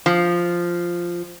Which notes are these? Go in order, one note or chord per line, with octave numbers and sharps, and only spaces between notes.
F3